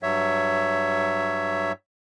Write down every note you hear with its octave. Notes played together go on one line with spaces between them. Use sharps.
G2 F#3 C#5 E5